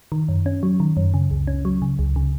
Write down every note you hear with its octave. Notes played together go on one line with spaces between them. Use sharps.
D#3
F#2
C#4
F#3
D#3
F#2
C#3
C#2
C#4
F#3
C#3
C#2
C#3